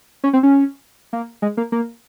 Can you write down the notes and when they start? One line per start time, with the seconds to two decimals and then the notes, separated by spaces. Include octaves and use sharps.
0.24 C#4
0.33 C4
0.43 C#4
1.13 A#3
1.42 G#3
1.57 A#3
1.72 A#3